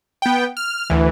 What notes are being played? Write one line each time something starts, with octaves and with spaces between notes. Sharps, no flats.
B3 G5
F6
D2 E3